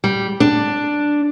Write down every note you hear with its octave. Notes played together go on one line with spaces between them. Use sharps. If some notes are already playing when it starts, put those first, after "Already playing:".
G3
D4